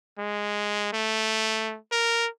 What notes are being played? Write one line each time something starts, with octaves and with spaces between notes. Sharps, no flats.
G#3
A3
A#4